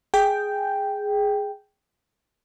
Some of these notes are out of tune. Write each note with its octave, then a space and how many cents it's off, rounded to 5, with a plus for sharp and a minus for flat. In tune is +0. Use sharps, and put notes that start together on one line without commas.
G#4 +0 G5 +0